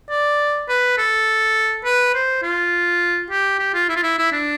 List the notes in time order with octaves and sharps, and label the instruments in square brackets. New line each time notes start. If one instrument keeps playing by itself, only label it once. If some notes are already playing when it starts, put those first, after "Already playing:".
[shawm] D5
B4
A4
B4
C5
F4
G4
G4
F4
E4
F4
E4
E4
D4